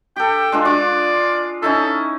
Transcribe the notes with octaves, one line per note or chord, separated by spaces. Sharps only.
G4 A4 G5
G#3 D4 F4
F4 D5
C#4 D#4 E4 A4